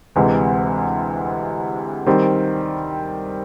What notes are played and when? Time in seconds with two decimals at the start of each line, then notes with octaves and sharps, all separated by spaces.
0.16 D2 C3 E3 G#3
2.06 D#3 G3 C4